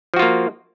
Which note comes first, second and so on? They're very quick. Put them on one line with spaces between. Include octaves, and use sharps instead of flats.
F3 F#4 F4 A#3